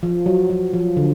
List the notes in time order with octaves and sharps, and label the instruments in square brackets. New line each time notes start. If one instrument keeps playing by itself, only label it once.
[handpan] F3
F#3
F#3
F3
D3